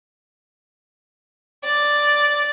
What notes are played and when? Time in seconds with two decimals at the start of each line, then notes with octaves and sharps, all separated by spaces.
1.64 D5